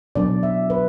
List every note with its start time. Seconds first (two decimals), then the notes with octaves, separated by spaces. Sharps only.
0.15 B2 F#3 D4 D5
0.43 E5
0.70 B4